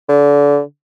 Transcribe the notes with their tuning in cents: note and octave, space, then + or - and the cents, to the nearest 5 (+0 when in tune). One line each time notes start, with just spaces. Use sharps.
D3 -30